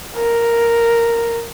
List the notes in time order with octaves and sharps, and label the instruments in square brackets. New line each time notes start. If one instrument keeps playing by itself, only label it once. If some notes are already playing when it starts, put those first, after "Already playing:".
[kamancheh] A#4